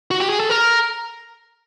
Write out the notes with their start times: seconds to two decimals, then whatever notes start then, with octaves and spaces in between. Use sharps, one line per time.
0.11 F#4
0.20 G4
0.30 G#4
0.40 A4
0.50 A#4